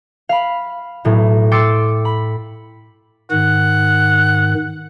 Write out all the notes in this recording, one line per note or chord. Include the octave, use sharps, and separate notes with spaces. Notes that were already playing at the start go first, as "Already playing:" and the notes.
F5 B5
B1 A2
G5 C6 D6 E6 A6 C#7
B5
G#2 D#3 F#5